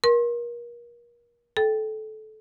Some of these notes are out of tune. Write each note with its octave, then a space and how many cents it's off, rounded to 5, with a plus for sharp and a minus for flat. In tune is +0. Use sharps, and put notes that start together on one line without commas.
A#4 +35 C6 +35
A4 -20 G5 +0